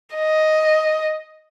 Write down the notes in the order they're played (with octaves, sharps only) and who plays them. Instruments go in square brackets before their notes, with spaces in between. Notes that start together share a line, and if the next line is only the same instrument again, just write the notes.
[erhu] D#5